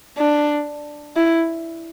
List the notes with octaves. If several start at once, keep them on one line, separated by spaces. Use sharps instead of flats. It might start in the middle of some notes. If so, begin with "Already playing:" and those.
D4
E4